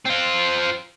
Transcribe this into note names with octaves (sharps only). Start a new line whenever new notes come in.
C4 F4